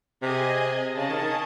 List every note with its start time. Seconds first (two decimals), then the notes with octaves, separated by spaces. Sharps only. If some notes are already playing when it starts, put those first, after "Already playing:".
0.22 C3 G#4 D#5 G#5
0.96 C#3 C#4 G#4 D#5 A5
1.09 D#3
1.21 D#3